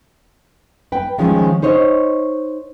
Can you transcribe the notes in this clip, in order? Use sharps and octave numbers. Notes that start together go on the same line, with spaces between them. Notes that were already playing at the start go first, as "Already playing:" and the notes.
B4 G5
D#3 F3 G#3 C#4
D#4 C5 C#5 D#5